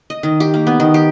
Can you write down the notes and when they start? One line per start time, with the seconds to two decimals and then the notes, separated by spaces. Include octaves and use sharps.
0.10 D#5
0.23 D#3
0.40 G4
0.54 A#3
0.67 B3
0.80 D#3
0.94 G4